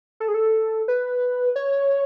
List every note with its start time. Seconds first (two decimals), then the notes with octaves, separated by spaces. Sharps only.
0.20 A4
0.28 G#4
0.34 A4
0.88 B4
1.56 C#5